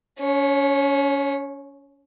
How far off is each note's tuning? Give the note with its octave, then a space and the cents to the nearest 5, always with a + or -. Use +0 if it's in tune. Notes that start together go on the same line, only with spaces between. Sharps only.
C#4 +30 C#5 -15